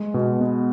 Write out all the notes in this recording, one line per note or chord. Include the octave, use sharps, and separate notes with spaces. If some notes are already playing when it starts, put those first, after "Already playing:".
Already playing: G#3
B2
B3